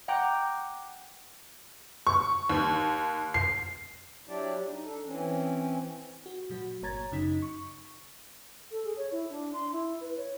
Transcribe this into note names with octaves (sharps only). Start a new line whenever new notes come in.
F#5 G5 A#5 D6 G6
C#6
D#2
C7
F#3 D4 E4 G4 D5
D#4
D4 A4
E3 C4 C#4
F#4
A#2 F#3 F#4
G1 A#3 C#5 A#5 G#6 A6
F#2 C#3 F#3 D#4 D#5 B6
C#6
A4
G#4
C#5
E4
D4
C6
E4
B4
C#5